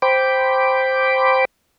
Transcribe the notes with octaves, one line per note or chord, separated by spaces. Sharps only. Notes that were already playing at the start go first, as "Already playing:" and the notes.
C5 G5 B5 D6